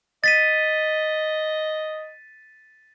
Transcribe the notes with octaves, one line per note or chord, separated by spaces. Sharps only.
D#5 A6 B6 D#7